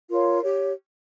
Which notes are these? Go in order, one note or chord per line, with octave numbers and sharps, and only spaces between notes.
F4 A#4 C#5
G4 C#5